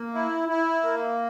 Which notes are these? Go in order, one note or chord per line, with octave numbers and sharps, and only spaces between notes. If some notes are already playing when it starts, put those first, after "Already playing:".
Already playing: A#3
E4
E4
A#3